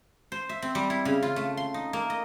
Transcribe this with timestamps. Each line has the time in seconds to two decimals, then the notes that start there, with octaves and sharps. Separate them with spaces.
0.32 C5
0.49 E5
0.62 C4
0.75 G3
0.90 E4
1.05 C#3
1.23 F4
1.36 A3
1.57 C6
1.74 D#4
1.93 A#3
2.10 D#5